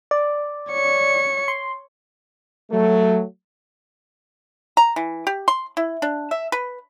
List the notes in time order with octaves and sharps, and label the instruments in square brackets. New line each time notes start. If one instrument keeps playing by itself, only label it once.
[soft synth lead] D5
[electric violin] C#5 C#7
[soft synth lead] C6
[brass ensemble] F#3 A3
[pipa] A#5
E3
G4
C6
E4
D4
E5
B4